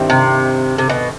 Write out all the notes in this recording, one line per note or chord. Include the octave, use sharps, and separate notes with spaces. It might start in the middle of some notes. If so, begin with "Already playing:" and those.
Already playing: G2 D#3 G3 C4 E4
C3
C3
B2